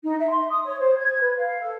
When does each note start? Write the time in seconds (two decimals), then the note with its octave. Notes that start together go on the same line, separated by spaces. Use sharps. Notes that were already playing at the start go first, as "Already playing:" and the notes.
0.04 D#4
0.19 E5
0.30 C6
0.50 D#6
0.65 C#5
0.79 C5
0.98 G#6
1.20 B4
1.37 F5
1.61 A4